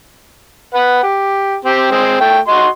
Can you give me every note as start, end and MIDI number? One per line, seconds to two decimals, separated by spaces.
0.74 1.00 71
0.74 1.00 78
1.03 1.57 67
1.65 1.91 60
1.65 1.91 67
1.91 2.19 56
1.91 2.19 60
2.20 2.39 57
2.20 2.39 79
2.48 2.67 66
2.48 2.67 75
2.48 2.67 84